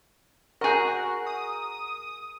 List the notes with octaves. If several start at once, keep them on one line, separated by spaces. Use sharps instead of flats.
F#4 G#4 A#4 D#5 C#6 G6
D#6